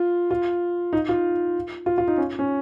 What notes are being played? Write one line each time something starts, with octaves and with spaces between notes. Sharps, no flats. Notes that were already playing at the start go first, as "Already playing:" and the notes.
Already playing: F4
F4
D#4
F4
F4
F4
D#4
C#4
C#4